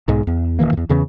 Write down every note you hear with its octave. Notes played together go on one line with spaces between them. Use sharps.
B1 G#2 G#3
E2
D#1 D#3 E3 A#3
E2 A2
E2 C#3 E3 C#4